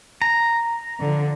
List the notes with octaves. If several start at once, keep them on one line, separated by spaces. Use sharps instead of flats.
A#5
D3 F3